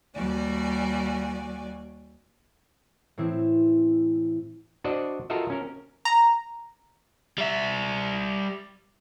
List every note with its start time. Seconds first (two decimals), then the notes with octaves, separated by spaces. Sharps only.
0.15 D#2 G3 F#4 D5 G#5
3.18 A2 E3 C4 E4
4.84 D4 F#4 C5 D5 D#5
5.30 F4 F#4 A4 A#4 D#5 E5
5.50 C#4 A#4
6.05 A#5
7.38 G3 E5